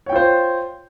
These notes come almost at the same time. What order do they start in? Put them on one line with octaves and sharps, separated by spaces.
C#5 G5 F4 C5